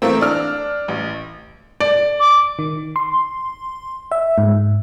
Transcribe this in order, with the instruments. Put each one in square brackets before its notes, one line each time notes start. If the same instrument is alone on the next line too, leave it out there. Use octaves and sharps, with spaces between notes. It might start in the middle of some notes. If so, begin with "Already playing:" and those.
[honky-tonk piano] E3 A3 A#3 C4
D4 F6
A1
[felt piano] D5
[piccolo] D6
[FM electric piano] D#3
C6
E5
G#2